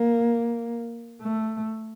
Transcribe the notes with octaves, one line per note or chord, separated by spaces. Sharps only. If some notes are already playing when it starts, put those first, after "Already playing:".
Already playing: A#3
A3